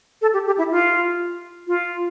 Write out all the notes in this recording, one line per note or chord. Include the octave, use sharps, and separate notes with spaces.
A4
G4
G4
E4
F4
F4